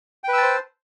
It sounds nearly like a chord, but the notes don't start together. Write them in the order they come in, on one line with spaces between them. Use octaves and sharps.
G5 B4 E6 A5 C5